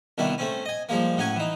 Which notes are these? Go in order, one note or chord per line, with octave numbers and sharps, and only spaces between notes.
C2 B2 D#3 D4 E4
A3 C4 C#4
D#5 G#5
F3 G3 G#3 A#3
A2 F#3 C#4 G#5 C#6
E3 D#4